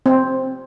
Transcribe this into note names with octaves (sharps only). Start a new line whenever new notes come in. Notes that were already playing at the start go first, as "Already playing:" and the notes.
C4